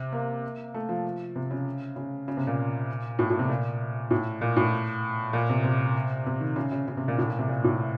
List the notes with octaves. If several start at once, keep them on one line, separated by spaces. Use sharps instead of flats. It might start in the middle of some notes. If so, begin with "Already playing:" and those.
Already playing: C3
A#3
A3
F3
C3
C#3
C#3
C#3
C3
A#2
A2
A2
C3
A#2
A2
A#2
A2
A#2
C3
C3
C3
D#3
C#3
C#3
C#3
C3
A#2
A2
A#2
C3
A#2
A2